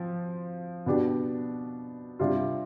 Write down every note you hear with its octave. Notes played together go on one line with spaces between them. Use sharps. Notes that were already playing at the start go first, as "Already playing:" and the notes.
Already playing: F3 C4
B2 B3 D4 G4
C3 G3 D4 F4